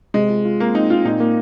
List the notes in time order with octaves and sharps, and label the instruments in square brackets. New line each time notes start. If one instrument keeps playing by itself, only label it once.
[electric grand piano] C3 [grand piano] G#3
[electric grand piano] F4
F4
[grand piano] A#3 [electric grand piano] C4
[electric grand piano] C4 [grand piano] D#4
[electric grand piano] C4 [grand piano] F4
[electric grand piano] A#2 [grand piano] D#4
[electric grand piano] A#3